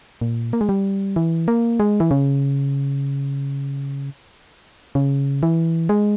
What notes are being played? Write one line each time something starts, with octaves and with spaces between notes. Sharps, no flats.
A#2
A#3
G#3
G3
E3
A#3
G#3
E3
C#3
C#3
E3
G#3